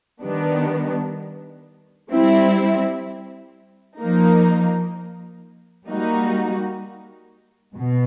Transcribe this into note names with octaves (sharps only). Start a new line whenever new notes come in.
D#3 G3 B3 D4
G3 C4 E4
F3 A#3 D#4
G3 A#3 D#4 F#4
B2